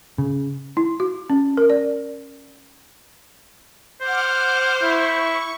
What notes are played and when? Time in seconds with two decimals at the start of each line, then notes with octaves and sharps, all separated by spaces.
0.18 C#3
0.77 E4
1.00 F#4
1.30 C#4
1.57 A#4
1.70 D5
4.01 C5 F#5 D6 F6
4.83 E4 C#6